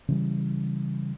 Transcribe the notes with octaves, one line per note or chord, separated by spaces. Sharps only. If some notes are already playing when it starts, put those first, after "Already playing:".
C#3 E3 G3